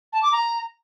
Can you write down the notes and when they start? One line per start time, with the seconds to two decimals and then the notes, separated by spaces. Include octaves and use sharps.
0.13 A5
0.23 D6
0.32 A#5